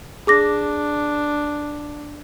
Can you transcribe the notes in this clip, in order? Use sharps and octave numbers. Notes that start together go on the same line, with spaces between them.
D4 G#4 D6 A#6